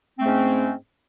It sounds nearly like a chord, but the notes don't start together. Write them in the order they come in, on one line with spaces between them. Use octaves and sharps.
C4 A3 G#2 C#4